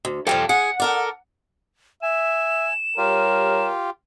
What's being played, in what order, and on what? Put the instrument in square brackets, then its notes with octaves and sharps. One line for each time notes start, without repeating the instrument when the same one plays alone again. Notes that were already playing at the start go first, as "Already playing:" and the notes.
[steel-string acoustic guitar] D2
[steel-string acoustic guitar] C3 F3 G3 [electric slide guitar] A4 F5 G5
[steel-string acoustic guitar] G#4 [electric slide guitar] F#5
[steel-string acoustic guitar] A4 A#4 D5
[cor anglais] E5 [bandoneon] G#5 [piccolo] E7
[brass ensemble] G3 C#5 [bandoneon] F4 G4 [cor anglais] A#4